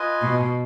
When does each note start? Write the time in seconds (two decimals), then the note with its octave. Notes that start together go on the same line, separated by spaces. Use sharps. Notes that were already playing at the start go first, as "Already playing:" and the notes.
Already playing: F4 B4 D#5 G#5
0.22 B2